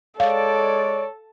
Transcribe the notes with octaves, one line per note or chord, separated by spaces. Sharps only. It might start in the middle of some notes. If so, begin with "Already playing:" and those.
G#3 A4 C#5 D5 F5